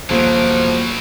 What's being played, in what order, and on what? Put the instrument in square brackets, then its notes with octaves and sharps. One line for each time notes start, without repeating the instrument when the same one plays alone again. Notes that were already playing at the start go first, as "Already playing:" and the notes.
[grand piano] D#1 [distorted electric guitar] B2 F#3 [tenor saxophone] F3